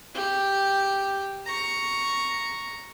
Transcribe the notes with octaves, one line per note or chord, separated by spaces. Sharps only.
G4
A#5 C#6